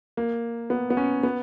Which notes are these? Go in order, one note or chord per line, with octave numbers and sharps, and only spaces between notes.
A#3
B3
B3
C#4
B3